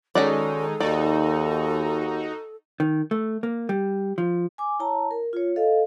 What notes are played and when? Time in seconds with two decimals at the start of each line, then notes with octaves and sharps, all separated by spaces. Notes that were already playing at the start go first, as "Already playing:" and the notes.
0.15 D#3 G#3 C#4 D#4 F#4 A4 D5
0.80 D#2 D#4 F#4 D5
2.80 D#3
3.11 A3
3.43 A#3
3.69 G3
4.18 F3
4.58 G#5 D6
4.79 E4 C#5 A5 A#5
5.11 A#4
5.33 F4 C#5
5.56 A4 D#5 F5